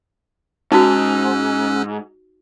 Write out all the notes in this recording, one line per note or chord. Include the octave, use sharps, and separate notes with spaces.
G#2 C#4 D#4 F#4 E6 F#6